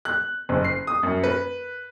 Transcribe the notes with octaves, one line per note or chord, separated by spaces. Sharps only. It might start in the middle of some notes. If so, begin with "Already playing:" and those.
F#6
F#1
C7
D#6
F#2
B4